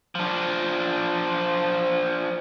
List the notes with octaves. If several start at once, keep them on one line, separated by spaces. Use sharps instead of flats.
F3 D4